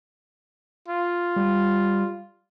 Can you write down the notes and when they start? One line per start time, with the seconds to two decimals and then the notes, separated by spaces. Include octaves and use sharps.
0.88 F4
1.36 G3